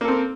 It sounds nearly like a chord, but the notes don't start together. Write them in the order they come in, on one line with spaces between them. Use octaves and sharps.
A#3 A4 C4